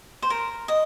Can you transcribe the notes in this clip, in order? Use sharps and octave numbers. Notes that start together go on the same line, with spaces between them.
C5
A#4
D#5